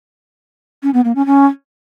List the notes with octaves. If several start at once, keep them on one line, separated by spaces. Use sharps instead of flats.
C#4
B3
A#3
C#4
C#4